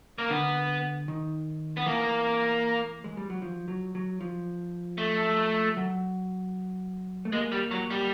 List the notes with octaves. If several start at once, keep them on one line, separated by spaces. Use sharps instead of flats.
A#3
D3 B3
D#3
B3
E3 A#3
G#3
G3
F#3
F3
F#3
F#3
F3
A3
F#3
A3
G#3 A#3
G3
F#3
G3